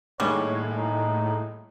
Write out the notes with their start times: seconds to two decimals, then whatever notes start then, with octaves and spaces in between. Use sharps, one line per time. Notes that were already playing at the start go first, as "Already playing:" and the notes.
0.20 A2 D#3 G3 G#3 A#3 C#5
0.77 D#4